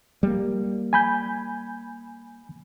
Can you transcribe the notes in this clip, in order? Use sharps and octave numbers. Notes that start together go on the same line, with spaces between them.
G3 A#3
G#5 B5 G6